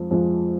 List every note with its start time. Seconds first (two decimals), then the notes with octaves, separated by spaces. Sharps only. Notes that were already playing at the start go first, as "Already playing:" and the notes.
Already playing: F2 F3 G#3
0.11 F2 F3 G#3